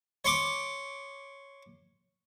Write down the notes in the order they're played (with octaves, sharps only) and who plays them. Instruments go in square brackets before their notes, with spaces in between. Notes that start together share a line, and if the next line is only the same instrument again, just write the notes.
[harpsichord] C#5 C6 D6